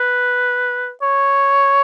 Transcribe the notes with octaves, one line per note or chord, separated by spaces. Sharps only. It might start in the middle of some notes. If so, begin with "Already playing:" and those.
Already playing: B4
C#5